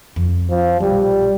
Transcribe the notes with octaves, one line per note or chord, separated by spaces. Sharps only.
F2
F3
A#1 B2 G3